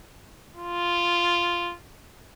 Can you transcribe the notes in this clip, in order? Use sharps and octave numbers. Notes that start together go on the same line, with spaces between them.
F4